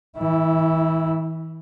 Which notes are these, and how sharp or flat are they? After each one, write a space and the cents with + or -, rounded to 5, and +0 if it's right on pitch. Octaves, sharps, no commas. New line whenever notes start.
E3 -35 E4 +0